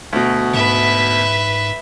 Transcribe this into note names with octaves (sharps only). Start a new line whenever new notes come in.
D2 B2
G#2 B4 E5